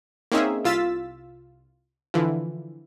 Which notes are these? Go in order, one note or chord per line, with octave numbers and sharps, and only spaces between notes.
A#3 C4 C#4 D#4 G#4 E5
C2 F4 E6 A6 B6 E7
D3 E3 F3